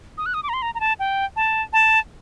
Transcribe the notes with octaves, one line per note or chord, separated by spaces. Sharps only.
D#6
F#6
D#6
D6
A#5
C6
A#5
A#5
A5
G5
A5
A5